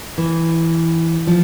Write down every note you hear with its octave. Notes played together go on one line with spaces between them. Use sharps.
E3
F3